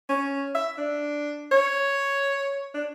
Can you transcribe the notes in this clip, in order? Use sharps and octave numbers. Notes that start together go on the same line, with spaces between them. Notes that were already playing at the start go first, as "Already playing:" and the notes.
C#4
E5
D4
C#5
D4